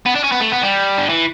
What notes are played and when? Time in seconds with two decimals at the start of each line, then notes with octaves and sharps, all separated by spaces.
0.06 B3
0.15 D4
0.24 C#4
0.32 B3
0.41 A3
0.52 B3
0.63 G3
0.98 D3
1.10 E3